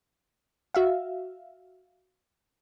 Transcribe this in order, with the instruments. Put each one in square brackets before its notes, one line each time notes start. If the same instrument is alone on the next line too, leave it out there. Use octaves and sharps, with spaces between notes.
[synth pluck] F#4 E5 F5